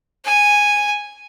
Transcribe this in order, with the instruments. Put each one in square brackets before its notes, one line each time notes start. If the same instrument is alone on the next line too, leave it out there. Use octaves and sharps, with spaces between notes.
[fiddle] G#5